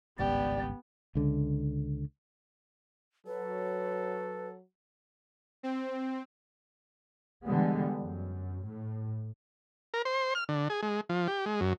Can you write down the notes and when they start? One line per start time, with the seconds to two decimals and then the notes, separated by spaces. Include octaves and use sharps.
0.19 G#1 C#2 G2 B3 G4 D5
1.15 C#2 D3
3.27 F#3 A4 B4
5.63 C4
7.45 D3 E3 G3 G#3 B3
8.01 F#2
8.65 A2
9.94 A#4
10.05 C5
10.35 F6
10.49 D3
10.70 G#4
10.83 G#3
11.09 F3
11.28 G4
11.46 G#3
11.61 F#2